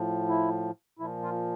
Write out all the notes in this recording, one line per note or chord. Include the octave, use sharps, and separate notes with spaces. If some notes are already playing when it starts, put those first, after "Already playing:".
Already playing: A2 F3
E4
A#2 F3 E4
F4